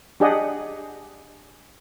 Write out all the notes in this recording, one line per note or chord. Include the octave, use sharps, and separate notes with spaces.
D4 G4 G#4 D5 D#5 F#5